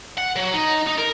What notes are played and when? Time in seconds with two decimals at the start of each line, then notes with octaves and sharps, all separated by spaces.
0.17 F#5
0.36 F#3
0.54 D#4
0.87 D#4
0.98 A#4